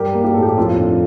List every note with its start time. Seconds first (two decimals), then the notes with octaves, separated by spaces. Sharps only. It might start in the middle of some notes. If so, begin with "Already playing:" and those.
Already playing: G2 G3 G4 A#4
0.15 A#3
0.25 G4
0.34 A2 A4
0.43 G4
0.57 F2 F4
0.79 D3